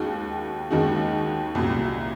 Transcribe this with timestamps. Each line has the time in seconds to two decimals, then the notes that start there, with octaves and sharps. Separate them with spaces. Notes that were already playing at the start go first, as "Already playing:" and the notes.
Already playing: D#2 D#3 G#3 D#4 F#4
0.70 D#2 D#3 G#3 D#4 F#4
1.55 C2 A#2 F#3